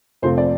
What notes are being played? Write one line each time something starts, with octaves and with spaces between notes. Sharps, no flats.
F2 C3 F3 A3 C4 C5
D5